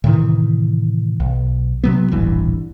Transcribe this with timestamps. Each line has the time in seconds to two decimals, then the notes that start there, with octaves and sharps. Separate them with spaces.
0.04 A2 C3 D#3 E3
1.20 B1
1.84 C3 F#3 B3
2.12 D#1 A1 G2 E3